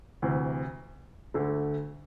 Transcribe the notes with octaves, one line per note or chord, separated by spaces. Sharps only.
D2 C3 E3
D2 D3 A3